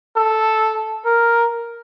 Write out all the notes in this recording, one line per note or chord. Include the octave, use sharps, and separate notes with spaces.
A4
A#4